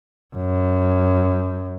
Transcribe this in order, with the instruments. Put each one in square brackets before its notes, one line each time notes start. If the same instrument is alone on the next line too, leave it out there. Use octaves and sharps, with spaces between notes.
[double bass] F#2